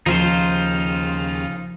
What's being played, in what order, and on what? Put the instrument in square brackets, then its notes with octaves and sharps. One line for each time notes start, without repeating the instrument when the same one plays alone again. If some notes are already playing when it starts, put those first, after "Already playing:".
[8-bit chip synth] D#2 C#3 [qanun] F3 [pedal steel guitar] D#4 F4 C5